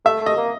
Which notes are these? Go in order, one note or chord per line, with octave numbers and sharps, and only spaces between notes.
A3 E5
A3 D#5
A#3